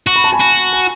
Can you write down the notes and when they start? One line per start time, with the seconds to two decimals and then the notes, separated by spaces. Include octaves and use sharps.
0.07 F#4 C#6
0.16 B5
0.24 A5
0.33 G#5 B5
0.40 F#4
0.73 G#5 B5